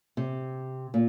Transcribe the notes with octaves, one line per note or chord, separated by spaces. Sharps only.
C3
A#2